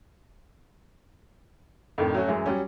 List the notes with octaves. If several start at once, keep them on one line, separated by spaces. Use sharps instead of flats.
F2 A2 D3 D#3
F#3 A3 C#4 F#4
F#2 E3 G#3
F#3 G3 C#4